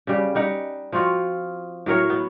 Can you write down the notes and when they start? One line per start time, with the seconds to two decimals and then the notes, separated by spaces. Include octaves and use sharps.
0.07 C#3 G3
0.35 G3 D#4 F#5
0.92 F3 C4 F4 F#4
1.86 A2 F#3 A#4 C#5
2.10 B3